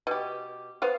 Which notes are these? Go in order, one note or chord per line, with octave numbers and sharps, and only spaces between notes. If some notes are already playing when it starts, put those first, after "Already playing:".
B2 G4
B3 C5 F5